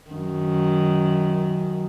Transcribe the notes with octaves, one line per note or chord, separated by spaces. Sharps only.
F#2 D#3